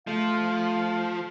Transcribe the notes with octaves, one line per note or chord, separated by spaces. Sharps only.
F3 A3 F5